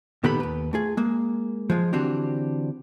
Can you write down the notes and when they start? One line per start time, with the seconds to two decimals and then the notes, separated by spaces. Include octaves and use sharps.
0.24 A#2 D#3 B3 G4 A4 B5
0.40 D#2 B4
0.73 A3 F4 G#4
0.97 G#3 A#3
1.70 F3 G#3 F4
1.93 D3 E3 C4 D4 F#4 G4